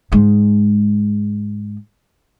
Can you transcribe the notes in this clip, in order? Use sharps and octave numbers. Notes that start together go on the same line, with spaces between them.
G#2 G#3